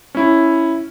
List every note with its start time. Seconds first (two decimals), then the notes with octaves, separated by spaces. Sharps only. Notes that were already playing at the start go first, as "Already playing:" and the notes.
0.15 C#4 E4